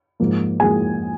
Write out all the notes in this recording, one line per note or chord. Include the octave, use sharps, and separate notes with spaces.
G#2 F3 A#3
G#2 F3 A#3 G#4 G#5